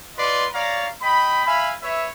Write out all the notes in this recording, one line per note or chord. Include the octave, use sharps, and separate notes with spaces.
F4 B4 D5 D#5 C6
C#5 D5 F5 A#5
D#5 G5 B5
E5 F5 G#5 B5
B4 C#5 E5